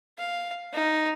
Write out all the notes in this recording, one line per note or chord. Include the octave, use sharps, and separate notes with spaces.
F5
D#4